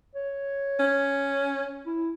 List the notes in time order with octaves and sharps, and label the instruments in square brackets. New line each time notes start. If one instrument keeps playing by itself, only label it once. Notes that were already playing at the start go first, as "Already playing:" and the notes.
[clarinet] C#5
[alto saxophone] C#4
[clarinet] E4